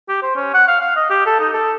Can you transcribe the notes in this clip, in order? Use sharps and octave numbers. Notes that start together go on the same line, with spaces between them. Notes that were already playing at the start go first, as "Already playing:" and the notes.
G4
C5
C#4
F#5
F5
F5
D#5
G4
A4
D#4
A4